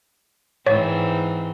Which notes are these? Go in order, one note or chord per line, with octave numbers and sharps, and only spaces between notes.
G#2 E3 C4 C#5